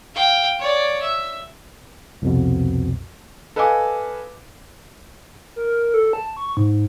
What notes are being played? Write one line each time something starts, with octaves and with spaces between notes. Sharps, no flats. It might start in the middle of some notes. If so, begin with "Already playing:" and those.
F5 G5
C#5 D5
E5
C2 F2 B2
A4 B4 D#5 F5 G#5 D6
A#4
A4
A5
C#6
G#2